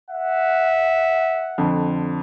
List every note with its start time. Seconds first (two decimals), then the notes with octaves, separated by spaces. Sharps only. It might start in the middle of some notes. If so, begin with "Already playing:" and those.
0.11 E5 F#5
1.58 F2 D3